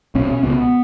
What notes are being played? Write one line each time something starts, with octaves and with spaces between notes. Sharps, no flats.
B1 B2 C#4
C#4
C#2 B2 B3